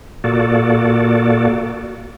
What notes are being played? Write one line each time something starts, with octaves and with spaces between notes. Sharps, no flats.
A#2 A#3 F#4 A4 D5